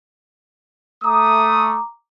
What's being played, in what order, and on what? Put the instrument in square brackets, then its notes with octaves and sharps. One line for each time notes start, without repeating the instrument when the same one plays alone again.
[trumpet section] A3 D#6 [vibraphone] A#5 D6